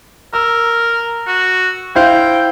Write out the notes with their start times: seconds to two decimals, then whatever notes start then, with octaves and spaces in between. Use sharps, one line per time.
0.33 A#4 E6
1.27 F#4
1.95 E4 C5 F5 G5